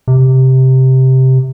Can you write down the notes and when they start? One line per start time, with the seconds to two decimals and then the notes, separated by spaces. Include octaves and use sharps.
0.08 C3